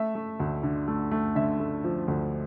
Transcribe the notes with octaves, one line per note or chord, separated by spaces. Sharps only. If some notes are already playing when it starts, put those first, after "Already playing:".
Already playing: A3 E5
A3
D2
D3
A3
A3
D3 E5
A3
F3
D2